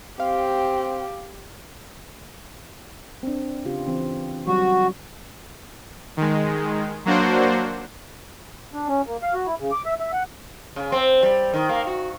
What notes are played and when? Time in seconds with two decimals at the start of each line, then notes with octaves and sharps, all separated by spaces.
0.20 C4 G4 F5
3.23 C4 D4
3.65 C#3 F4 G4
3.88 E3 C4
4.47 F#3 G3 F#4
6.17 D#3 G#3
7.05 F#3 A#3 D4 F#4 C5
8.73 D4
8.88 C#4
9.06 A#3
9.22 F5
9.34 F#4
9.47 E4
9.59 C#3
9.72 D6
9.85 E5
10.00 E5
10.13 F#5
10.76 C#3
10.92 C4
11.23 G3
11.54 D#3
11.69 A#3
11.87 F#4